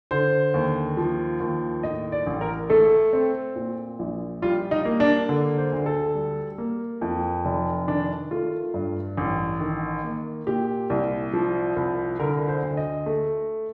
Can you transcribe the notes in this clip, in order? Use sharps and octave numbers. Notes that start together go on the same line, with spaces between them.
D3 C5
D#2
F3
D#2
A2 D#5
D5
A1
A#4
A3 A4
C4
A#2
A#1
G3 F4
D#4
A#3
D4
D3
C5
D2
A4
G3
A#3
F2
F1
D#3 D4
A3 F4
G2
A1
D#3
A#3
A#2 G4
C2
F3
C2
D3 A#4
C5
D2
D#5
A3